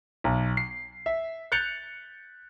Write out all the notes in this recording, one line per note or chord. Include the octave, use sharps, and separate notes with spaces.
B1
C7
E5
F#6 G6 A6 C#7 F7